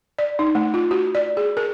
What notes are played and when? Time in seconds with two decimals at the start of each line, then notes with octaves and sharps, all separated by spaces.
0.19 D5
0.39 D#4
0.55 A3
0.74 F4
0.91 F#4
1.15 D5
1.37 G#4
1.57 A#4